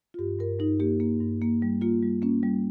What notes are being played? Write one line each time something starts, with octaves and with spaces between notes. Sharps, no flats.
F4
G2 G4
G2 A#4
G2 D#4
A#3 G4
A#3
G2
A#3
G3
A#3 F4
G3
A#3 C#4
G3